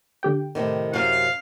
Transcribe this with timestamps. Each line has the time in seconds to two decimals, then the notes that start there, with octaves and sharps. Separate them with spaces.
0.23 D3 G4 G5
0.55 A2 C3 D#3
0.94 F#2 C3 F5